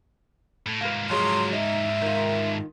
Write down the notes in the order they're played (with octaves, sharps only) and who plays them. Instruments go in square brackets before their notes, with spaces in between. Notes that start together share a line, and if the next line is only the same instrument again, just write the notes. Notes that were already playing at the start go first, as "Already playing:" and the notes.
[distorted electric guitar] A2
[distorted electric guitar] G#2 A#3 [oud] F4 B4
[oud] F3 F#3 G#3 [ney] C6
[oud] D#4 [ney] E5
[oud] D#3 F4